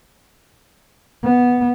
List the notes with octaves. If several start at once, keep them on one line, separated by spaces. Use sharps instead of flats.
B3